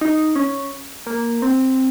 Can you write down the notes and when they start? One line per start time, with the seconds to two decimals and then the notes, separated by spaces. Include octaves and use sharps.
0.01 D#4
0.36 C#4
1.07 A#3
1.42 C4